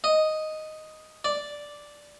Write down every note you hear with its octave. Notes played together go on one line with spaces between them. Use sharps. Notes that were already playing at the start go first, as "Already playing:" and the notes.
D#5
D5